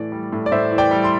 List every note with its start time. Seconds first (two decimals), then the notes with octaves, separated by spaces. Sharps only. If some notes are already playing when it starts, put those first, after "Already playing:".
Already playing: A2 E3 D5
0.12 G3
0.32 A2
0.46 D5
0.52 A2 C5 E5
0.71 E3
0.78 D5 G5
0.91 G3
1.04 C6